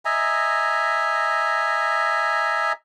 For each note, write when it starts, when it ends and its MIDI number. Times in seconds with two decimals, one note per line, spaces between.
0.05 2.72 75
0.05 2.72 76
0.05 2.72 80
0.05 2.72 82